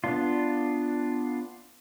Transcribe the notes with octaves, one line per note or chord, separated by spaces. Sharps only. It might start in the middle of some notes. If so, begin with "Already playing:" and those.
B3 D4 F4